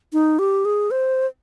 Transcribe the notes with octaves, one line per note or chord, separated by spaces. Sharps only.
D#4
G4
G#4
C5